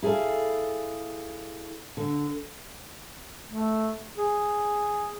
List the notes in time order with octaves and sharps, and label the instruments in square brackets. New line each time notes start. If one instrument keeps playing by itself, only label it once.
[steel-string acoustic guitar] E4 G#4 A4 F5
D3
[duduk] A3
G#4